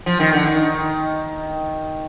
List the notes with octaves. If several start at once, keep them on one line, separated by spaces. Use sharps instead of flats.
F3
D#3
D3
D#3